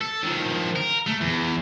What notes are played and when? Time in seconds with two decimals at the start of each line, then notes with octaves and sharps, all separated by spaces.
0.01 A4
0.23 D#3 F3
0.76 A#4
1.07 A3
1.21 E2